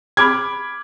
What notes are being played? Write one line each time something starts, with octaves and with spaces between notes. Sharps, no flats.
B5 D6 F6 G#6